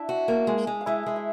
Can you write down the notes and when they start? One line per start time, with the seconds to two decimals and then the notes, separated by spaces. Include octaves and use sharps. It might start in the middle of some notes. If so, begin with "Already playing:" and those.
Already playing: D4 E4 D5 E5
0.09 F#4
0.28 A#3
0.47 G#3
0.67 G#3
0.81 F5
0.86 G#3 E4 E5
1.06 G#3
1.16 E5